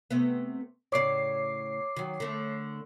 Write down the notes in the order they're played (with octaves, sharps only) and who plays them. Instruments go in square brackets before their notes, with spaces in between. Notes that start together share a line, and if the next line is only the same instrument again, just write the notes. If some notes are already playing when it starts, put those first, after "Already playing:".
[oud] C3 A3 B3
[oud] A2 C#3 D5 [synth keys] C#5 D6 C7
[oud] D#3 F#3
D3 A3